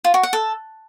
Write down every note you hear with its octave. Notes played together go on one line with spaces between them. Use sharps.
F4
F#4
F#5
A4